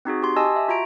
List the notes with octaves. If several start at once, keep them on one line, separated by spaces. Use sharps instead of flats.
C4 D#4 F#4 G#4
G4 C6
G4 D#5 G#5 A5 E6
E5
F4 F#4 E5 A#5 D7